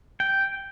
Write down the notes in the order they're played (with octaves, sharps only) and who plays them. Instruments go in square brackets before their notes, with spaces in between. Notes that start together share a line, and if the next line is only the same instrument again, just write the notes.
[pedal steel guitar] G5